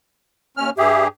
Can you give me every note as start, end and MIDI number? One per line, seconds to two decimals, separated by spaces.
0.57 0.70 39
0.57 0.70 61
0.57 0.70 89
0.78 1.08 43
0.78 1.08 67
0.78 1.08 68
0.78 1.04 76